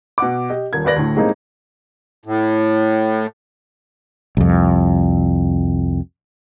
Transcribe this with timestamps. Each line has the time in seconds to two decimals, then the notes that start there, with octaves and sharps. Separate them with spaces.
0.18 B2 F#5 D6
0.50 G4 D#5
0.73 D#1 A#4 G#6
0.85 D#2 A#4 B4 D5 A#6 F#7
0.96 D2 A2
1.16 A2 G3 G#3 A#3 C4 D#4
2.26 A2
4.37 C2 F2